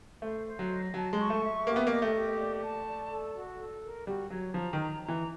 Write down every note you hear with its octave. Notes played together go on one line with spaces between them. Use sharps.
A3 C5
C5
F#3
D#5
F#3 A5
G#3
C#6
A3
E5
A#3 G4
B3
A#3 D#5
A3
G4
D5
A5
D5
A4
F#4
A4
A#4
G3 F#4
F#3 C#5
F3 A#5
D#3
A#5
A#5
E3